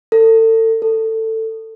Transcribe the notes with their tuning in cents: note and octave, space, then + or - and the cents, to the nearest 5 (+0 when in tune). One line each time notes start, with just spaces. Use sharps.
A4 +35
A4 +20